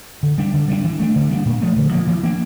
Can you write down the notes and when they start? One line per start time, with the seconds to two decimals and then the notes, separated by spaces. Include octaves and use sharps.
0.23 D3
0.38 G3 D4
0.54 D3
0.68 G3 A#3 D4
0.84 E3
0.99 A3 D4
1.16 D3
1.30 G3 A#3 D4
1.45 A#2
1.62 F3 A3
1.77 D3
1.92 F3 A#3
2.07 E3
2.23 A#3 D4